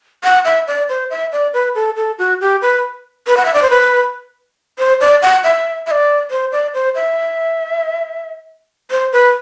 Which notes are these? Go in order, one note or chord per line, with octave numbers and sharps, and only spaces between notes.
F#5
E5
D5
C5
E5
D5
B4
A4
A4
F#4
G4
B4
B4
F#5
E5
D5
C5
B4
C5
D5
F#5
E5
E5
D5
C5
D5
C5
E5
C5
B4